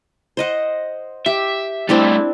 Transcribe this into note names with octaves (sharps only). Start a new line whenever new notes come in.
C5 D#5 F#5
G4 E5
G3 A3 C4 D4 E4